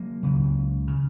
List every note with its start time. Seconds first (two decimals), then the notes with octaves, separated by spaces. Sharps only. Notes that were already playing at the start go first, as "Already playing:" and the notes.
Already playing: F#3 A#3
0.23 C#2 C#3
0.88 C#3